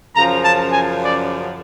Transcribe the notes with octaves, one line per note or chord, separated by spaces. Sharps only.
F#2 C#3 F3 A#5
A5
G#5
D5